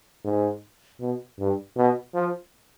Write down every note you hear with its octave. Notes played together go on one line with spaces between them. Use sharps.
G#2
B2
G2
B2
F3